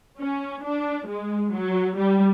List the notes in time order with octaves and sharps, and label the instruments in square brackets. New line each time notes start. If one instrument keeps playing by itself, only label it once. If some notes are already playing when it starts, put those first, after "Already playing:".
[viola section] C#4
D4
G#3
F#3
G3